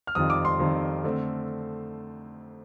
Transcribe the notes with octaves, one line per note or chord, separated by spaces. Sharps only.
F6
F2 D#3 G3 C4 F4 D#6
D6
C6
F2 D#3 G3 C4 F4
D3 A3 C4